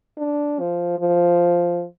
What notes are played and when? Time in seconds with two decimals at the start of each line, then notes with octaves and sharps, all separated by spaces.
0.17 D4
0.59 F3
0.99 F3